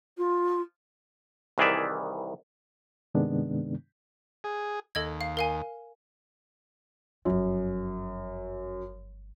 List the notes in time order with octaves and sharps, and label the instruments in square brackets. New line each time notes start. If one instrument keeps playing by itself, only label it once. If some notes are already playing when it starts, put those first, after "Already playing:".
[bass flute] F4
[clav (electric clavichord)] C2 D#3 E3 G#4 D5 E5
[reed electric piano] G2 C3 D#3 G#3 B3 D4
[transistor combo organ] G#4
[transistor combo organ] D#2 [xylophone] A4 D#5 G#6
[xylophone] F5
A#4 F5 G#5
[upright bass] G1 F3 [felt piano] F#2